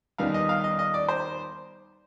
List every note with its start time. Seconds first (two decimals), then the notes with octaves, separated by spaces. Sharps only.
0.18 D#2 D#3 G3 B3 D#4 F5
0.34 D#5
0.49 F5
0.64 D#5
0.79 D#5
0.94 D5
1.09 C5